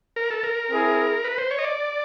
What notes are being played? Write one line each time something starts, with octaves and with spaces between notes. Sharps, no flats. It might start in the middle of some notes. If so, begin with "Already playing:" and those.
A#4
A4
A#4
C4 E4 G#4
B4
C5
C#5
D#5
D5